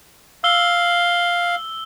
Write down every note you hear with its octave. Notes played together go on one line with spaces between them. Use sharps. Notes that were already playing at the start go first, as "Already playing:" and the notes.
F5 E6 G7